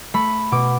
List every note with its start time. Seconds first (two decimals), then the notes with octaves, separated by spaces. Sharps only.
0.14 A3 B5
0.52 B2 D6